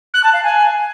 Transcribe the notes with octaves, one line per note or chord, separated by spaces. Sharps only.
F#6
A5
F5
G#5